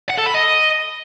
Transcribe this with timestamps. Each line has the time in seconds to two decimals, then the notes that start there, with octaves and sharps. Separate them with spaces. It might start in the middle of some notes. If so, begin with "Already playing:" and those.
0.09 F#5
0.18 A4
0.26 B5
0.34 D#5